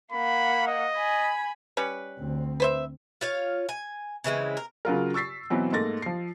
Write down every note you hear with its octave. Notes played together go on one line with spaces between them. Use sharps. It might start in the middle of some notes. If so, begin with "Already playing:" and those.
A#3 F#5 B5
D#5
G#5 B5
G3 C#4 B4
D2 C4
B4 C5 E5
F4 C#5 F5
G#5
C#3 E3 G#3 C4
A#4
C#3 F#3 F4 A#4
C#6 E6 A6 B6 C7
B2 E3 F#3 C4
G#2 A3 A#3 A6 A#6
F3 C7